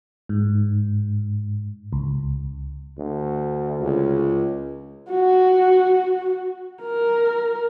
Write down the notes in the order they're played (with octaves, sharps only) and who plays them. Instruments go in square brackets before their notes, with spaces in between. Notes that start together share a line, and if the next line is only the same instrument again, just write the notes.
[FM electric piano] G#2
C#2
[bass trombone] D2
[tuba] C#2
[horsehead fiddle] F#4
A#4